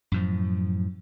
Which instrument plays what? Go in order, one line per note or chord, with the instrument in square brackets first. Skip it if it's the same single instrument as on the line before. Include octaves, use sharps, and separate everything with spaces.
[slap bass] F#2 A2 F3